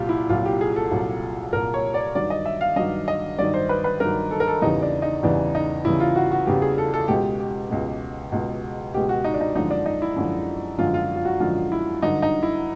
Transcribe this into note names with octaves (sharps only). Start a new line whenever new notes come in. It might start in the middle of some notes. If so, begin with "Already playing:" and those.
Already playing: C2 A#2 F#3 F4 G4
E4
C2 A#2 F#3 F4
G4
G#4
A4
C2 A#2 F#3
C2 A#2 F#3 A#4
C#5
D5
G2 D#3 F#3 D5
D#5
E5
F5
G2 D#3 F#3 D#5
D#5
G2 D#3 F#3 D5
C5
B4
B4
G2 D#3 F#3 A#4
A4
A#4
A4
E2 C#3 E3 G3 D#4
D4
D#4
E2 C#3 E3 G3 D4
D#4
E2 C#3 E3 G3 E4
F4
F#4
F#4
E2 C#3 E3 G3 G4
G#4
A4
A4
C#2 B2 G#3 G4
G4
C#2 B2 G#3
C#2 B2 G#3
C#2 B2 G#3 G4
F#4
D#4
D4
D#4
F#2 D3 F3 G#3 D#4
D4
D#4
E4
F#2 D3 F3 G#3
F#2 D3 F3 G#3 F4
F4
F4
F#4
F#2 D3 F3 G#3 F4
E4
G2 D3 F#3 D#4
D#4
E4